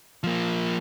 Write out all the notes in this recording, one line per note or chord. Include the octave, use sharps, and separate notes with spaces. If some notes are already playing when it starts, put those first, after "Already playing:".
F3 A#3